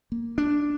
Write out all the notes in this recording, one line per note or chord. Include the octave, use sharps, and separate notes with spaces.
A#3
D4